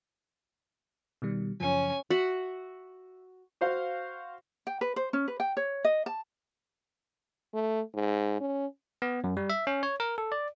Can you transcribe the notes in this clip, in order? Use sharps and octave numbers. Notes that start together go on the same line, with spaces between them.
B2 D#3 G3
F#2 C#3 F3 C#4 G#5
F#4 E5 F#5
F#4 C5 F5
G5
B4
C5
C#4
B4
G5
C#5
D#5
A5
A3
G#2
C#4
B3
F#2
G3
E5
C#4
C#5
A#4
A4
D5